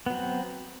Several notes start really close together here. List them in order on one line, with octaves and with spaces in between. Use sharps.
B3 F#3 C4